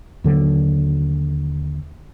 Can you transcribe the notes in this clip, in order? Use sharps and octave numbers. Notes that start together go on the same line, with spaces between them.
D#2 D3 F#3